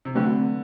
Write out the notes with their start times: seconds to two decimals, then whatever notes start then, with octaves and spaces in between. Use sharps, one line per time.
0.05 C3
0.15 D3 F#3 A3 C4 F#4 B4